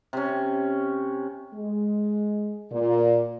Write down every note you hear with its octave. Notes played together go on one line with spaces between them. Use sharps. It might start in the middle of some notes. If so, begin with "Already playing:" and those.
C3 C#4
G#3
A#2